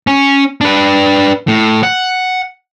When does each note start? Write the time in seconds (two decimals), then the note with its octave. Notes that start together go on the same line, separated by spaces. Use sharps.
0.07 C#4
0.61 D4 B4
1.47 A2
1.83 F#5